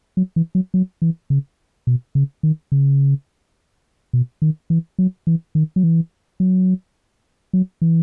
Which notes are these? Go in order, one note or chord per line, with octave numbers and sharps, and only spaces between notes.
F#3
E3
F#3
F#3
E3
C#3
B2
C#3
D#3
C#3
B2
D#3
E3
F#3
E3
D#3
F#3
E3
F#3
F#3
E3